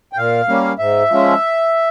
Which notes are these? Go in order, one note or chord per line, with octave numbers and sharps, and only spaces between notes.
G5
A#2 F5
G3 A#3 C#4
G#2 E5
F3 G#3 C#4